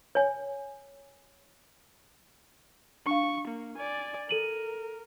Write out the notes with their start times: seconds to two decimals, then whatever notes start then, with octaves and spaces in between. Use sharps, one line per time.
0.15 C#5 G#5
3.06 D4 F5 C#6
3.48 A#3
3.77 D5 G#5
4.29 A4 A#4 D#7 F#7